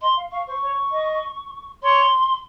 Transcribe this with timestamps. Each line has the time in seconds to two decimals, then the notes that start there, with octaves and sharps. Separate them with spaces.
0.01 D#5 C6
0.16 F5
0.31 F5 C#6
0.46 C5 C#6
0.62 C#5
0.91 D#5
1.82 C#5 C6